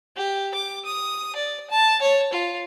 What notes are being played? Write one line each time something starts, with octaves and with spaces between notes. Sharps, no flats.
G4
D6
D#6
D5
A5
C#5
F4